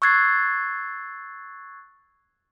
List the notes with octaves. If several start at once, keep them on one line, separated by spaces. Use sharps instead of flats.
C#6 E6 F#6 G#6 A6 C7